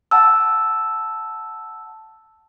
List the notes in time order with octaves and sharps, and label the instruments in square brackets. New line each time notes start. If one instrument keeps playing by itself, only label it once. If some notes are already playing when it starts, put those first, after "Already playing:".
[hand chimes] F#5 A5 E6